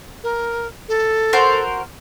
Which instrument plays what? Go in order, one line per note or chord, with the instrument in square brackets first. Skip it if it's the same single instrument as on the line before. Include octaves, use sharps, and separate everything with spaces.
[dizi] A#4
A4
[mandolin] F#4 A#4 C5